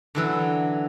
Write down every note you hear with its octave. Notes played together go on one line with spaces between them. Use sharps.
D3 E3 F#3